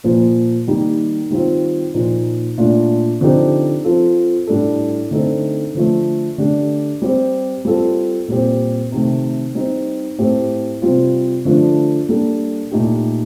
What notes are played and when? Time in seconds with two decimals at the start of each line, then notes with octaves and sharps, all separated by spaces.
0.04 A#2 F3 A#3
0.67 D#3 G3 A#3 D#4 G4
1.31 D#3 G3 C4 F4
1.94 A#2 F3 A#3 D#4
2.58 A#2 A3 D4 F4
3.21 D3 F3 C4 D#4 G4
3.84 F3 C4 F4 A4
4.47 A2 G3 D4 A4
5.11 D3 A3 C4 D#4 A4
5.75 D3 F3 A3
6.38 D3 A3 D4 G4
7.02 G3 C4 G4
7.65 G3 C4 F4 A4
8.28 A#2 G3 C4 G4
8.92 C3 D#3 A3
9.55 G3 C4 D#4
10.18 A2 A3 C4 G4
10.82 C3 G3 C4 F4
11.45 D3 F3 A3 D4 F4
12.09 G3 A#3 D4 A4
12.72 A#2 A3 D#4 G4